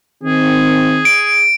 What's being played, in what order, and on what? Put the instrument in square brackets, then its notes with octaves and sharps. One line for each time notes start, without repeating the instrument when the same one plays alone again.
[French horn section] D#3 C4 [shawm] G#4
[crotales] D7